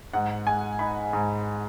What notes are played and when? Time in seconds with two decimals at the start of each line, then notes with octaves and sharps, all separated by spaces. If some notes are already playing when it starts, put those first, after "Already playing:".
0.13 G#2 F#5
0.47 G#3 G#5
0.79 D#4 B5
1.13 G#2